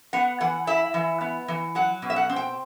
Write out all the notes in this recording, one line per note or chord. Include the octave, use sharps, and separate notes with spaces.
B3 F#5
E3 F#5
E4 E5
E3
B3
E3
F#3 F#5
B2
E5
F#5
C4
G5